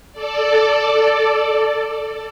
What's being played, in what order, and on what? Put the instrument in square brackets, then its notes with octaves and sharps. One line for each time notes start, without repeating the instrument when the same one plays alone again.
[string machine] A4 D5